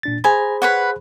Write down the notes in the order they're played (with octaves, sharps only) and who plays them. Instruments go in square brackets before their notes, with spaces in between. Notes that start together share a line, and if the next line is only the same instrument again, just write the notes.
[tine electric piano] A#2 D4 A6
[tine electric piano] G#4 C5 B5 [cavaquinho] G#5 A#5
[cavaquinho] B4 C#5 F#5